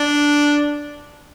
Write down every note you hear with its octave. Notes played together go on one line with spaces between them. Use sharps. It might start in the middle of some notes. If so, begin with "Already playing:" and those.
Already playing: D4